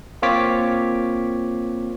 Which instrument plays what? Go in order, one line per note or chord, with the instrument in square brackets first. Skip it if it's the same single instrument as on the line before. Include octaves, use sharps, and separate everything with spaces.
[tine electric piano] A#3 C4 F4 C#5 D6 B6